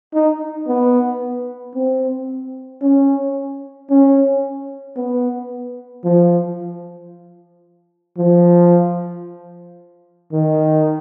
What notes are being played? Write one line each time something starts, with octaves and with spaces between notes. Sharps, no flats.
D#4
B3
C4
C#4
C#4
B3
F3
F3
D#3